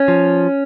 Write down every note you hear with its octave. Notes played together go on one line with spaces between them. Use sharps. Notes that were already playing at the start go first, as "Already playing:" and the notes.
Already playing: C#4
F3